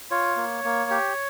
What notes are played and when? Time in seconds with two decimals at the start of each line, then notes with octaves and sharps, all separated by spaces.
0.11 F4 C#5
0.37 A#3
0.64 A#3
0.90 G4